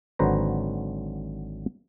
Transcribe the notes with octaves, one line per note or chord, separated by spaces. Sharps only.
G#1 D3 F#3 B4 C5 A#5